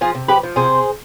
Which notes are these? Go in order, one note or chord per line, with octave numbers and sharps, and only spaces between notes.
F3 F4 G#4
C3
F3 G4 B4
F3
C3 G#4 C5